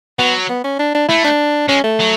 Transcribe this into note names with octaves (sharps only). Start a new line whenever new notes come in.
F#3 B3
B3
C#4
D4
D4
A3 E4
D4
G#3 C#4
A3
F#3